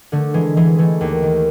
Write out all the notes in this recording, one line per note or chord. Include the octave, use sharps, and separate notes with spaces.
D3 A3
E3 G#3
E3 G#3
E3 A3
D#2
D#3